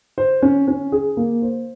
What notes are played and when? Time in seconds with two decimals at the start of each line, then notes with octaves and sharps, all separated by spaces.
0.18 C5
0.42 C#4
0.68 C#4
0.92 G#4
1.17 A#3
1.42 C5